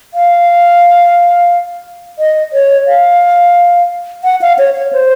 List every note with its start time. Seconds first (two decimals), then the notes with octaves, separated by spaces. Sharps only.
0.14 F5
2.19 D#5
2.53 C#5
2.87 F5
4.24 F#5
4.41 F5
4.58 C#5
4.76 C#5
4.93 C5